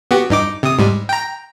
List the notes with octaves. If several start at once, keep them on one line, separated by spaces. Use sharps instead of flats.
B3 F#4 G4
G2 D#4 D6
C3 D#6
G#2 G3
G5 A#5